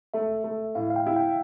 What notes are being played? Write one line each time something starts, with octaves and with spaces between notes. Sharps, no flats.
A3 E5
A3
A2 F5
F5
G5
E4
G5